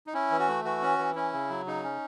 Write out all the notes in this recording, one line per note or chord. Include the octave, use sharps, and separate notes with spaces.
D#4
C#4 E4
E3
F#4
A3
E3 F#4
C#4
E3
C#4 E4
C#3
F#3
C#3 D#4
C#4